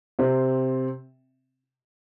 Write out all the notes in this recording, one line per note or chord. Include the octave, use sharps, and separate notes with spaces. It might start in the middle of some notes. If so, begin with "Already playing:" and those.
C3 C4